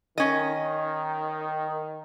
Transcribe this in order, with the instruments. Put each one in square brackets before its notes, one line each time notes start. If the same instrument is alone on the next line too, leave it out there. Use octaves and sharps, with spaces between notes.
[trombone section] D#3 [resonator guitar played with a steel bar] C#4 D#5